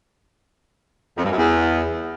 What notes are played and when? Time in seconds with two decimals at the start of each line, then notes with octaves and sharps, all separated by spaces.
1.17 F2
1.23 G2
1.30 F#2
1.36 E2